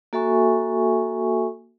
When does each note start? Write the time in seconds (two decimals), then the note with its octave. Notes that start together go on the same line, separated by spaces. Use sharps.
0.13 A#3 F#4 A4 E5 G#5 C#6